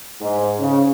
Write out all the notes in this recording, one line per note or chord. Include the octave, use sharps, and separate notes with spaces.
G#2
C#3